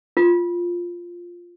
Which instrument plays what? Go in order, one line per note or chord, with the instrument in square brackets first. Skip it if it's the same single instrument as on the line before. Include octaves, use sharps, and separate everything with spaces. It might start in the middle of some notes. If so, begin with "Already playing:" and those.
[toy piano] F4